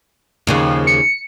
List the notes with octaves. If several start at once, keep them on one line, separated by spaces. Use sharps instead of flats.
D#2 C#3 F3
C#7